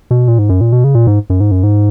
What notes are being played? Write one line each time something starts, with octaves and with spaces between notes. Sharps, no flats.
B2
A#2
G#2
F#2
A#2
B2
C#3
A#2
G#2
F#2
G#2
F#2
G#2